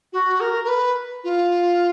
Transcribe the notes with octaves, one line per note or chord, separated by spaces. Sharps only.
F#4
A#4
A#4
B4
F4